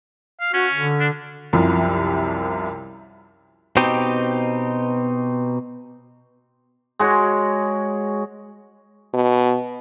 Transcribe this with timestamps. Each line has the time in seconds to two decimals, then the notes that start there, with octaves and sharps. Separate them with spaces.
0.40 F5
0.54 C#4 F#4
0.74 D3
1.00 D4
1.53 C2 F#2 C3 F3
3.77 B2 C4 D#4 G4
7.00 G#3 F#4 C#5
9.14 B2